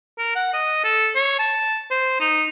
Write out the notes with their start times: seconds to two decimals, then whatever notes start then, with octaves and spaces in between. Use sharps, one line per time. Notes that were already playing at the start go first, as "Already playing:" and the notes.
0.18 A#4
0.35 F#5
0.54 D#5
0.84 A4
1.16 C#5
1.39 A5
1.91 C5
2.21 D#4